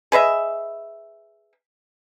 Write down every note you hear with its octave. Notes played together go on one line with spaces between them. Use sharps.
G#4 B4 D#5 E5